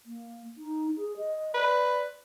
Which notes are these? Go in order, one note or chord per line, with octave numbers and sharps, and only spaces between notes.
A#3
D#4
G#4
D#5
B4 D5